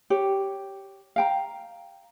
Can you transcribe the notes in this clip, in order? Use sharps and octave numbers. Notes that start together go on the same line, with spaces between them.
G4 C#5
F5 G5 A#5